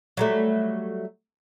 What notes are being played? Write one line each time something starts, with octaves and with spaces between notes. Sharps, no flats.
F#3 G3 A3